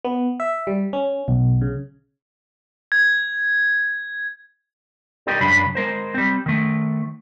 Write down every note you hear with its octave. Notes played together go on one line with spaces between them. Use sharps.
B3
E5
G3
C#4
B1
C#3
G#6
G4 A#4 D5 D#5 G5
F#2 C#3 G#3 D4 B4 B5
G#3 A#4 C5
G3 C4
D#3 A3